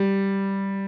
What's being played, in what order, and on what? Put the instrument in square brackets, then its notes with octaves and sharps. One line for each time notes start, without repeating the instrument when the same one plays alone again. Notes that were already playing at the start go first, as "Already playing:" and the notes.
Already playing: [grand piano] G3